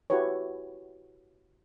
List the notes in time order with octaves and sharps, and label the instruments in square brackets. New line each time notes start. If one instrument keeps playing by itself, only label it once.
[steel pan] E4 F#4 G4 B4 C#5